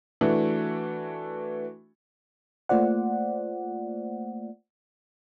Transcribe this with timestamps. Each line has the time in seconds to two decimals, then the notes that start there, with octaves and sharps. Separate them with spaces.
0.21 E3 A3 D4 F#4
2.69 A3 A#3 F4 C5 D5 F#5